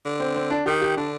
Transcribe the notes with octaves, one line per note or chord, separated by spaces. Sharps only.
D3
C4
C4
D4
D#3 G4
G4
D3 D4